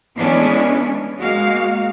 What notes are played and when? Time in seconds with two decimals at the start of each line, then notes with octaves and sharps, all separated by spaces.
0.17 E3 G#3 A3 B3 C#4 D4
1.18 G#3 A#3 F#4 F5